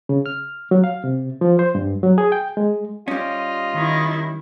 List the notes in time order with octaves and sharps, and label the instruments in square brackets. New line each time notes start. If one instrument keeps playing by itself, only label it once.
[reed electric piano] C#3
F6
F#3
F5
C3
F3
C5
G2
F#3
G#4
G5
G#3
[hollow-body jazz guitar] G3 C#4 [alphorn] F4 [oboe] D#5
[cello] D#3 E4